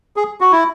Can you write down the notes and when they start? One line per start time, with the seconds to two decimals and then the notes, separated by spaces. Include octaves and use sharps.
0.16 G#4
0.41 F#4
0.52 E4